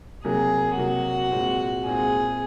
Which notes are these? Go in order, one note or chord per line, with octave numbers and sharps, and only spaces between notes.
C3 F#3 A#3 G#4
C3 F#3 A#3 F#4
A#2 G#3 C4
A#2 G#3 C4 G#4